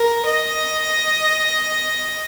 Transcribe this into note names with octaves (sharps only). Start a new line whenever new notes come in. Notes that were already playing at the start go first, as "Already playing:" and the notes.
Already playing: A#4
D#5